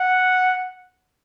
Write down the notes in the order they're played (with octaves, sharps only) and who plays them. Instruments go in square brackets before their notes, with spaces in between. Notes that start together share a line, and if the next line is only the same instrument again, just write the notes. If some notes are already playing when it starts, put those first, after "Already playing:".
Already playing: [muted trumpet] F#5